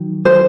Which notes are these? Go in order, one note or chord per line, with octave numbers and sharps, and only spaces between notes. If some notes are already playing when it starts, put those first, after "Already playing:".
Already playing: D#3 F#3
C5